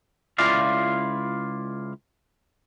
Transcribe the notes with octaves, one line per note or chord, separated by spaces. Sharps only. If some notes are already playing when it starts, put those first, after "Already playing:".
C#2 E4 F4 D5 F5